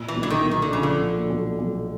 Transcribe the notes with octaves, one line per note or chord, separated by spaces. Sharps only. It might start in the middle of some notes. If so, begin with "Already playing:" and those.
Already playing: A#2
E3
B1
D3
D#3
B1
D#3
D3
C#3 F3
D3
A#2
B1
B1